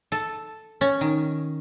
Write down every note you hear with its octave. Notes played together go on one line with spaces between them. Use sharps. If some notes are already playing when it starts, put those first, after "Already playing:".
A4
C#4
D#3